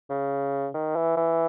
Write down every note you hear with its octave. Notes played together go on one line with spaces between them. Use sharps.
C#3
D#3
E3
E3